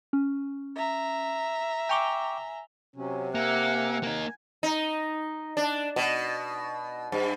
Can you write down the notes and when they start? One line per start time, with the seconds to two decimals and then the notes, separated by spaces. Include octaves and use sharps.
0.13 C#4
0.76 E5 A#5
1.89 G5 G#5 C#6 D6 F7 G7
2.96 C3 F#3 C#4
3.35 A#3 E5 F#5 G#5
4.03 A#3 D#4 G#5
4.63 D#4
5.57 D4
5.96 B2
7.12 G2